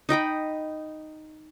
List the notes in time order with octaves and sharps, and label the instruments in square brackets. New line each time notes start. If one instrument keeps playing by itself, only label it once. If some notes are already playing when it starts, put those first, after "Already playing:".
[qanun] D#4 D#5 G5 B5